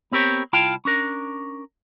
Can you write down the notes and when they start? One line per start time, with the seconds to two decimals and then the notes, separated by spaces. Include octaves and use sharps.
0.12 B3 C4 G4 A#4 C#5
0.53 C2 E4 F4 F5 G5 A5
0.85 C#4 D4 A#4